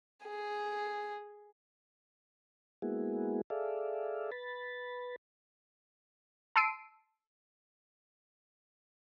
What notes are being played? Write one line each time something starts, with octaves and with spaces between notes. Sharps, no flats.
G#4
G#3 A#3 B3 E4 F#4 G#4
G#4 A4 D5 E5 F5
B4 B5 A6
A5 C6 E6 C7 D7 D#7